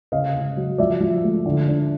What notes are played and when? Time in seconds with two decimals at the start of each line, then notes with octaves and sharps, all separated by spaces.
0.12 C#3 D#5 F5
0.35 C#3
0.57 F#3
0.78 F3 D5 E5
1.00 F3
1.24 A3
1.46 D3
1.68 D4